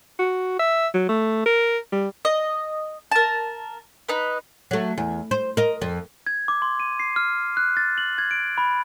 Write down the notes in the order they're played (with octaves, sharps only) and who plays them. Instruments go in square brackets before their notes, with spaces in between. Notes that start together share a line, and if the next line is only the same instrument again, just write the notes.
[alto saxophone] F#4
E5
F#3
A3
A#4
G3
[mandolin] D#5
A#4 A5
D#4 B4
[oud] F#3 A3
E2
C5
A#4 D#5
F2
[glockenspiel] G#6
D6
C6
D#7
C7
F6
F#6
A6
F#7
G#6
D7
B5